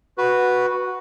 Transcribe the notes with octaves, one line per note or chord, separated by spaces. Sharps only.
F#4 B4